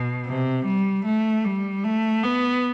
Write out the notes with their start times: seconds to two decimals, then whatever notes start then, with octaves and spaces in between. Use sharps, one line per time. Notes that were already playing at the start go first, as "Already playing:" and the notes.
Already playing: B2
0.26 C3
0.65 G3
1.05 A3
1.45 G3
1.84 A3
2.23 B3